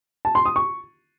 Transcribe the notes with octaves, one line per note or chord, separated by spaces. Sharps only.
A5
C6
D#6
C#6